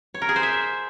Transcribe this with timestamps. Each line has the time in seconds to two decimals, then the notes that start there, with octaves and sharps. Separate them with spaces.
0.14 C#5
0.22 A#4
0.29 G#4
0.36 C5
0.43 E5